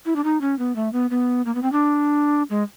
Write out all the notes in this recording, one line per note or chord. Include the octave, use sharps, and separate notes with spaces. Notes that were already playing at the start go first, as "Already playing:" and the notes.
E4
D4
D#4
C#4
B3
A3
B3
B3
A#3
B3
C4
D4
G#3